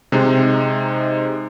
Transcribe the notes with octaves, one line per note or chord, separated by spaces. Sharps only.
C3 G#3 D#4